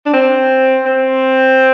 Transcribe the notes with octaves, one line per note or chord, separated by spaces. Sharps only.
D4
C4
C4